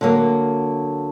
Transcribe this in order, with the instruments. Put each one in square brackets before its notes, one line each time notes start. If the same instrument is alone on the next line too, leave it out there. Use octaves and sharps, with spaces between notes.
[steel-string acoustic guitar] D3 F#3 A#3